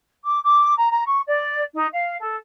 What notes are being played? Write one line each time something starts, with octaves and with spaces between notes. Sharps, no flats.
D6
D6
A#5
A#5
C#6
D5
D#4
F5
A4